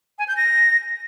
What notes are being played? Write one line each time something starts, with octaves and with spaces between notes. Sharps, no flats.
G#5
G6
A#6